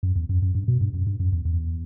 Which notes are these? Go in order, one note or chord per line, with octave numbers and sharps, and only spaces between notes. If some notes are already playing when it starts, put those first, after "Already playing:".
F#2
E2
F#2
F#2
G2
B2
G2
F#2
G2
F#2
E2
E2